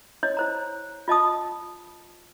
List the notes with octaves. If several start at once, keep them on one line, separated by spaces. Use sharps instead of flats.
E4 C#5 D#5
E4 C5 A#5
F4 D#5 A5 D#6